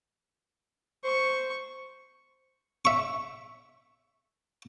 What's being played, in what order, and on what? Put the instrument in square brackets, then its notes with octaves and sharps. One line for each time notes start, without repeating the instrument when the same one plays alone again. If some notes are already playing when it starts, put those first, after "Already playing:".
[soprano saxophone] C5 [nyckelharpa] C#6
[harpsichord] E5 C#6